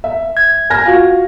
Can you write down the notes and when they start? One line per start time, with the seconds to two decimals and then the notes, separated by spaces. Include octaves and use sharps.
0.04 E5
0.37 G#6
0.70 G#5 F6 A#6
0.85 F4 F#4